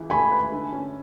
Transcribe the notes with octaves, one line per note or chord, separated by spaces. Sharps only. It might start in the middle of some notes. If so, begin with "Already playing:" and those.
Already playing: C#2 E3 E4
A3 G#5 B5
B4
D3
C#4